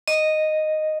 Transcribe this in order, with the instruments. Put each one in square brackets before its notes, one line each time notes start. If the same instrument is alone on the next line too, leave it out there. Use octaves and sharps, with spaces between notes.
[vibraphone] D#5